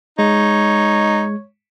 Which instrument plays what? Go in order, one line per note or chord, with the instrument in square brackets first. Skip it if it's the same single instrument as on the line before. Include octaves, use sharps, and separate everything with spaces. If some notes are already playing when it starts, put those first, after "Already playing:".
[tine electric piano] G#3 [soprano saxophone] D#4 [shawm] C#5